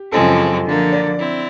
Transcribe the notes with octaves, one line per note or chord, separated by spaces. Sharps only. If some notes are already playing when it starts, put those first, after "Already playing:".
Already playing: G4
F#2 C#3 F3 G#3 C4 A4
D3 F3 A#3
D5
C4 E4